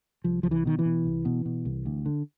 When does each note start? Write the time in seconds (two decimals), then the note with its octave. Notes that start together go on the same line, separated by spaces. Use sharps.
0.24 C2 F3
0.43 C2 F3
0.51 E3
0.65 B2 D#3
0.79 E3
0.85 B2
1.05 C2
1.25 B2
1.45 B2
1.65 C2
1.86 D2
2.06 D3